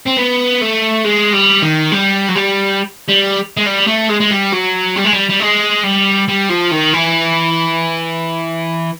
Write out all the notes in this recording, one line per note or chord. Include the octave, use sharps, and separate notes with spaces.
C4
B3
A3
G#3
G3
D#3
G3
F#3
G3
G3
G#3
G3
A3
G#3
G#3
G3
F#3
G3
G#3
G3
G3
G#3
G3
G3
F3
D#3
E3